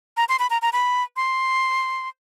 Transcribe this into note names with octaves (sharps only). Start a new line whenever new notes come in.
A#5
C6
B5
A#5
A#5
B5
C6